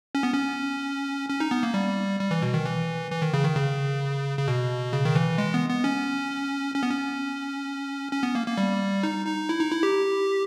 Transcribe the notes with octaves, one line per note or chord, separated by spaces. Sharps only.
C#4
B3
C#4
C#4
D#4
B3
A#3
G3
G3
E3
B2
D#3
E3
E3
D#3
C#3
D#3
C#3
C#3
B2
C#3
D#3
E3
G#3
B3
B3
C#4
C#4
B3
C#4
C#4
B3
A#3
A#3
G3
D#4
D#4
E4
D#4
E4
G4